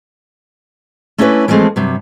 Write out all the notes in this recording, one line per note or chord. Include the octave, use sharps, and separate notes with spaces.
A3 C#4 D4 E4 A#4 B4
E3 F3 G#3 A3 C4
G2 C3 F#3